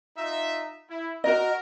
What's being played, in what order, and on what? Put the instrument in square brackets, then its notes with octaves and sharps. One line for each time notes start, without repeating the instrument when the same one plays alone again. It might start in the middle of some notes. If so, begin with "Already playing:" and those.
[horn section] D#4 F4 E5
E4
[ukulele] F#4 D#5 [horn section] A#4